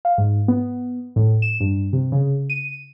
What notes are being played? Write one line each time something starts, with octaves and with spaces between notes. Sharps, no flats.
F5
G#2
B3
A2
E7
G2
C3
C#3
D#7